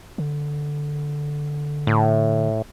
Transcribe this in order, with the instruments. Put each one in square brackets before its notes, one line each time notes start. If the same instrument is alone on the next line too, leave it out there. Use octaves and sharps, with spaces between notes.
[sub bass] D3
[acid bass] A2